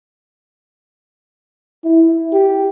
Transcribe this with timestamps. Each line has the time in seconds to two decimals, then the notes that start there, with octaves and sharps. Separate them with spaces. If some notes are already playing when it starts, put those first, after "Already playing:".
1.84 E4
2.33 G4